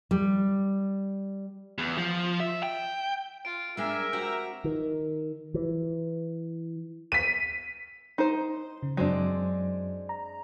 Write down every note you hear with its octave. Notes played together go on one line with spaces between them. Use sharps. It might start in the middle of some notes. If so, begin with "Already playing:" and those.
G3
E2
F3
E5
G5
F4 D7
G#3 D4 G#4 A#4 E5 G5 G#5
C4 F#4 G4 A#5
D#3
E3
B6 D#7
D#4 C5 C6
C#3
F#2 F#3 G#3 C4 D4
A#5